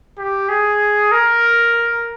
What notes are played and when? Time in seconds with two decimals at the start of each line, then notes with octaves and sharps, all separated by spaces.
0.18 G4
0.49 G#4
1.11 A#4